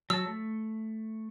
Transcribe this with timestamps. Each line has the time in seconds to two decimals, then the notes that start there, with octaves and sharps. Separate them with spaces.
0.10 F#3 A5 E6
0.27 A3